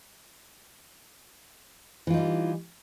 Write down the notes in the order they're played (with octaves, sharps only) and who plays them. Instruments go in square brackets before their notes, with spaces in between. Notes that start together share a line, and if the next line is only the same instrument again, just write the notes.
[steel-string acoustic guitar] E3
F4
D#4
G3